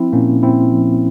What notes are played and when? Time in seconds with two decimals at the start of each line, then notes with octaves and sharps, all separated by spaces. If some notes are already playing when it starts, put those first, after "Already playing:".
Already playing: F3 C4 E4
0.13 A#2 A#3 C#4
0.43 A#2 C4 E4
0.72 F3